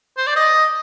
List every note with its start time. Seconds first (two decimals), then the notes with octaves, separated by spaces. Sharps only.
0.17 C5
0.27 D5
0.36 D#5